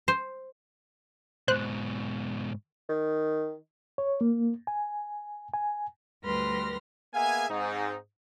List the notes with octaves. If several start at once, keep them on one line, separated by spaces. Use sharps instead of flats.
C5
G#2 B2 C5 F#6
D#3
C#5
A#3
G#5
G#5
D2 G3 B4 C6 F6 A#6
A#3 B3 G#4 E5 F5 G#5
G#2 C4 D#4